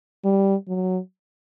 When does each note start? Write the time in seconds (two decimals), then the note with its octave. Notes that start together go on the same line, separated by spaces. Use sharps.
0.24 G3
0.68 F#3